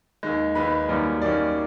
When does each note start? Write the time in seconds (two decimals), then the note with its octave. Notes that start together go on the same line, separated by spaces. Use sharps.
0.23 D#2 D#3 G#3
0.55 D#2 D#3 G#3 B4 B5
0.89 F#2 D#3 G3 A#3 C#4
1.22 F#2 D#3 G3 A#3 C#4 D5 D6